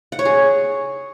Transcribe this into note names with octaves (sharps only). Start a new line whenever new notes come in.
F#5
C#5
G#4